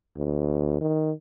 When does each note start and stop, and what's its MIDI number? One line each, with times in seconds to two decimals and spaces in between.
0.17 0.79 38
0.81 1.12 51